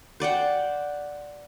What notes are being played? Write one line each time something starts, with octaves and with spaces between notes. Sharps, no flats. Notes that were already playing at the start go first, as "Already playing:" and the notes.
C5 D5 F#5 G5